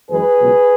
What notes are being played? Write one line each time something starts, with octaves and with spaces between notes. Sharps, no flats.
F#2 E3 G#3 G#4 B4
C#2 B2 F#3